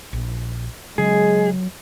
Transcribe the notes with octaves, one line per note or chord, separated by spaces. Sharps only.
A#1
C#3 F#3 G#3 G#4